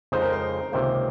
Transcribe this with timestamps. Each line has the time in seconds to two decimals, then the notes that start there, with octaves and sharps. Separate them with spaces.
0.12 F2 C#3 F3 G#3 D#4 C5
0.22 A#4
0.33 C5
0.72 C#2 C3 D#3 A#3 C5